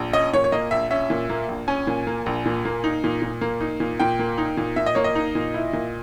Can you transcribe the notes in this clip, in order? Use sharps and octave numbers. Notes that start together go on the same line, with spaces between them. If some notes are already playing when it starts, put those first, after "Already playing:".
Already playing: A#1
C#4 D#5
A#2 C#5
C#5
A#3 D#5
A#1 E5
C#4 E5
A#2
A#3
A#1
C#4 G#5
A#2
A#3
A#1
A#2
A#3
D#4
A#2
A#2
A#3
D#4
A#2
A#2 G5
A#3
D#4
A#2
A#2 E5
D#5
A#3 C#5
D#5
D#4
A#2
E4
A#2